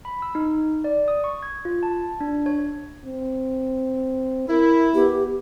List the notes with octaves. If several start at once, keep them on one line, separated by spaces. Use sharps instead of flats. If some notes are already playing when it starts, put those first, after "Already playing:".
B5
E6
D#4
D5
D#6
C#6
G#6
F4
A5
D4
C#5
C4
E4 A#4
B3 G4